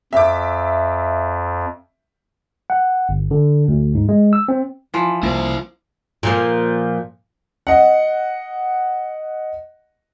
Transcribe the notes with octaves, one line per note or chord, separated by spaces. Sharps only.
F2 E5 D6
F#5
G1
D3
D2
G#2
G#3
E6
C4
E3 F3
C2 A#3 E4 C5
A#2 F3 A#3
D#5 F#5